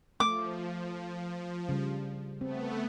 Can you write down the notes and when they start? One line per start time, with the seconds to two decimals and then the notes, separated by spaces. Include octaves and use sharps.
0.20 F3 A3 D6
1.69 C#3 G3
2.41 A3 B3 C4